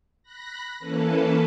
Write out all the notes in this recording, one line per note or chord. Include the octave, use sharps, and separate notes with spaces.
B5 F#6 A#6
E3 A#3 C#4 A4 B4 A5